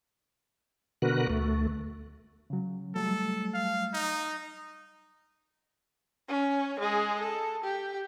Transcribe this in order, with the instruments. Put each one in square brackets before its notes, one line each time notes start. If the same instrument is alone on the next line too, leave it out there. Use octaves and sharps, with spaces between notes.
[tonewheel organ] B2 D3 F#4 A#4 B4 F#6
D2 A3
[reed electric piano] C#3 F#3
[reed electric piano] F#3 G3 A3 [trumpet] A4
[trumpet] F5
D#4
[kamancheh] C#4
G#3 G#4
A4
G4